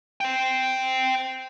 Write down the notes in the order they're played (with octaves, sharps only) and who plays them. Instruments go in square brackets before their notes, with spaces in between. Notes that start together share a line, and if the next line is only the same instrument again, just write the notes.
[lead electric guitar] C5 G5